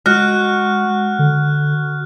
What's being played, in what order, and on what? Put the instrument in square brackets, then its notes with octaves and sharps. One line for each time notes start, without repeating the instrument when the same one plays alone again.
[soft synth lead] G#3 [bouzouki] F#4 [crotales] F6 F#6
[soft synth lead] D3